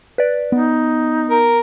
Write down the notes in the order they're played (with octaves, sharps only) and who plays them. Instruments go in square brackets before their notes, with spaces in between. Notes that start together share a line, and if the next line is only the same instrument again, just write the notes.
[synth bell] B4 D5
[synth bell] B3 [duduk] D#4
[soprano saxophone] A#4